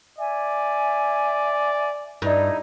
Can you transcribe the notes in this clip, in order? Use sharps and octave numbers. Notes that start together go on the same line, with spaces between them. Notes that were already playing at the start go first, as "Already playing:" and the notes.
D5 E5 G#5
G2 D#4 E4